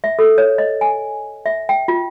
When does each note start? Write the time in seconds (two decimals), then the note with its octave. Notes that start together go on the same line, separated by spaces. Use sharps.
0.04 E5
0.19 A4
0.38 C#5
0.58 D#5
0.81 G#5
1.46 E5
1.69 G5
1.88 F4